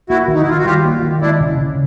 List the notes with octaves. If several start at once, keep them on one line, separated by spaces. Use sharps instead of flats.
A#3 E4 F#4
D#3
D#4
E4
D#3 F4
F#4
G3 F4 G4
A#3
D#3
G#3 D4 E4
C#3
C#3